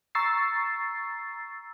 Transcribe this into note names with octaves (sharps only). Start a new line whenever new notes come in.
A#5 C#6 E6 A6 C7